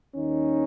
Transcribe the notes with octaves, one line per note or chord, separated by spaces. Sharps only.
D#2 D#3 G3 C#4 D#4